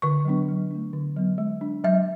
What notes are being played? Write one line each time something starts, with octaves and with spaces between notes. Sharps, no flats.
D3 C#6
F#3 B3 D4
F#3
A3 D4
D3
F#3 B3
G#3
D4
F#3 E5